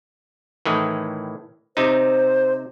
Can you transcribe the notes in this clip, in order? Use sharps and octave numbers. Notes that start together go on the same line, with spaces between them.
A2 D#3 E3
C3 D#4 C5